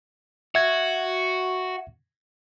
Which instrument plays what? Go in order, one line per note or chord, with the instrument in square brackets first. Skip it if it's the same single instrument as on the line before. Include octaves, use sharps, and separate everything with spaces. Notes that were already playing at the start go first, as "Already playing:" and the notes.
[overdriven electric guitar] F#4 [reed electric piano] E5 G#6